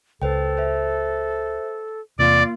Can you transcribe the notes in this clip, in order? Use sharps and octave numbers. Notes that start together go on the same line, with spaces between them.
C#2 A4 B4 C5 G5
C5 E5
E2 C3 A#3 F4 D5